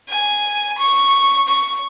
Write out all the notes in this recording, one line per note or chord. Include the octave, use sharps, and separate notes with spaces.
G#5
C#6
C#6